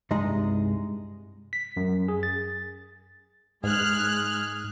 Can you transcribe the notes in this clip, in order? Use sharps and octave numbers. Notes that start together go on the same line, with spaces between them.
C2 G2 G#3 D#4 G#4 D#5
B6
F#2
G#4
A6
G#2 G#3 G#4 F6 F#6